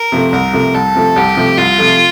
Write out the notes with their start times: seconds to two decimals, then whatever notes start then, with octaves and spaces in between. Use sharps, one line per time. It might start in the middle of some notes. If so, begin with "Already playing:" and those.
Already playing: A#4
0.12 C3 F3 A3
0.32 C2 A#4
0.53 C3 F3 A3
0.74 C2 A4
0.95 C3 F3 A3
1.16 C2 G4
1.37 C3 F3 A3
1.57 C2 F4
1.78 C3 F3 A3